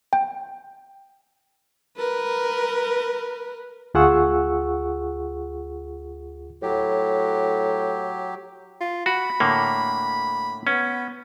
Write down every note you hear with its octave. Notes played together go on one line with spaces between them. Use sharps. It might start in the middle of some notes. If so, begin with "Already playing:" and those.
G5
A#4 B4
D2 F4 G#4 F#5 C#6 E6
A2 F#3 G4
F4
F#4 B5
A2 D3 A#3
B3 C#4